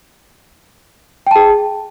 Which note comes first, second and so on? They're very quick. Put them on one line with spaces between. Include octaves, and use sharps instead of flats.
G5 A5 G#4